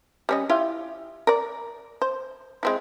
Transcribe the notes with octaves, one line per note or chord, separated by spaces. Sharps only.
G3 C#4 D#5
E4 F4 G4
A#4 D5
C5
G#3 C4 E4